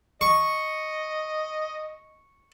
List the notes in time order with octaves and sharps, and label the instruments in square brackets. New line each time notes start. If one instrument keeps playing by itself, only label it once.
[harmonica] D#5 [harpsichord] C#6